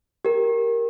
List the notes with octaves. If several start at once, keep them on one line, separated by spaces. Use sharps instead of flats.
G4 A#4